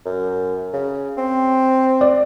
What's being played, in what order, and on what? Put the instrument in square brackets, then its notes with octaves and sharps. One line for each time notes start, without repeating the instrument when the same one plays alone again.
[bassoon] F#2
C#3
C4
[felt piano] D5